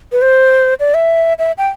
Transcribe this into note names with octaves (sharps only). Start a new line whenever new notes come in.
B4
C5
D5
E5
E5
G5